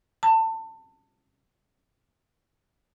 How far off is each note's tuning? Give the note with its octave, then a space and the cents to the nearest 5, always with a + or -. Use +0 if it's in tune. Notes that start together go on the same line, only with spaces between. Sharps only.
A5 +25